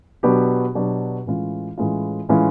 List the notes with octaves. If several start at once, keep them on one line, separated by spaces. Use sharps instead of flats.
B2 F#3 B3 D4 G4
B2 F#3 B3 D4 G4
A2 E3 G#3 C#4 F4
A2 E3 G#3 C#4 F4
A2 E3 G#3 C#4 F4